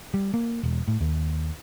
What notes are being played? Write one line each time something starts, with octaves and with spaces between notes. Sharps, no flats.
G3
A#3
E1
A2
D#2